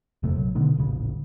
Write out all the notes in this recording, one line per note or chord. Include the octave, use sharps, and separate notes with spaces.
F#1 E2 C3 A3
A#1 F#3
B2 D3 D#3 A3
D#1 A1 C#3